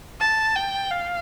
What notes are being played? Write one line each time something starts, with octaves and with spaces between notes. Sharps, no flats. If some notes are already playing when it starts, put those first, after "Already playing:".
A5
G5
F5